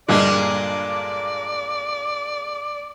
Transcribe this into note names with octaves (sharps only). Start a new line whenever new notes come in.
G2 A#2 D3 G#3 A#3 D4 D5